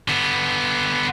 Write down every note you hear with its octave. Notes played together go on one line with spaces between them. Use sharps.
D3 B3